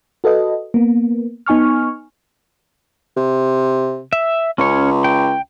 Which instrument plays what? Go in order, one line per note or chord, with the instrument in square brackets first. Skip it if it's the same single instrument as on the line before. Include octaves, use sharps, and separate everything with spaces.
[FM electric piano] F#4 A4 B4 D#5
A#3 B3
B3 D#4 G#5 C#6 F6
[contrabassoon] C3
[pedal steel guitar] E5
[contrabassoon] C#2 [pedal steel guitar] C#4 C#5
[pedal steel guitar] G5